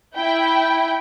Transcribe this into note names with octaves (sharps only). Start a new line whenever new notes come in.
E4 G5